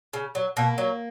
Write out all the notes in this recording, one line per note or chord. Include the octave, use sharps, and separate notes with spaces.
C#3
F#3
B2 A#3
F#3